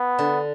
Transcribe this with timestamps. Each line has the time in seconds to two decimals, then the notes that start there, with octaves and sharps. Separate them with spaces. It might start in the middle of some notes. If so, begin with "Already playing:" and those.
Already playing: B3
0.19 D3